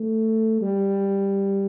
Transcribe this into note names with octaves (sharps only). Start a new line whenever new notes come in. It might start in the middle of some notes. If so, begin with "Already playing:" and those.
Already playing: A3
G3